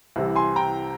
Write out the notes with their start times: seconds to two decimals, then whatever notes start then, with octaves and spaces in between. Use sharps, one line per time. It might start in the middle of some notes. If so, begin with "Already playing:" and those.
0.16 C2 C3 E3
0.36 G#5 C6
0.56 G5 A#5